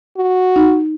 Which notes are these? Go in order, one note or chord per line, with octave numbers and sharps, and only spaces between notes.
F#4
D#4